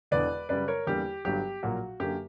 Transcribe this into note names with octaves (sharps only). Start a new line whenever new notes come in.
E1 E2 D3 B4 D5
F#2 C#3 G3 B4 D5
A#4 C#5
E2 D3 G3 A#3 G4
G1 G2 F#3 G4
A#1 A#2 F#3 A#3 F#4
F#2 D3 A#3 G4